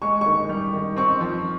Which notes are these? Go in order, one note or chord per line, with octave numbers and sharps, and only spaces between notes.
G#3 C#6
D#3 C#6
G3
D#3
C4 C#6
F3